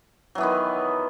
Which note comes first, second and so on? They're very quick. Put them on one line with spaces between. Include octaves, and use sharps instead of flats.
F#3 E3 B3 D#3